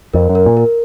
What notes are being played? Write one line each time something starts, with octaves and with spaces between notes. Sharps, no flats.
F2 A#4
F#2
A#4
A#2
A#4